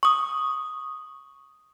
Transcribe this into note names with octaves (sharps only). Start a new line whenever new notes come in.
C#6 D#6